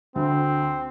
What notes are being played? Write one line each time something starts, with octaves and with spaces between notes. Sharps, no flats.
D2 C4